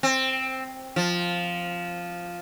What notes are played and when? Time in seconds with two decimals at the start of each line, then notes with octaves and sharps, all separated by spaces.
0.03 C4
0.96 F3